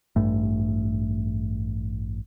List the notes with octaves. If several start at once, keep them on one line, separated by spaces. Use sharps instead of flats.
A1 G2 A3